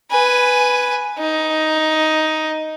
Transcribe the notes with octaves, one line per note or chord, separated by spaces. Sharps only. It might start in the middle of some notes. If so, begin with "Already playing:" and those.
B4 G#5
D#4